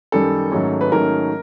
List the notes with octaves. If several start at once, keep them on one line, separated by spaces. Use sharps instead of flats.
F#2 D#3 G3 A4
G#2 D#3 F#3 A3 C#4
B4
G#2 D#3 F#3 A3 C#4 A#4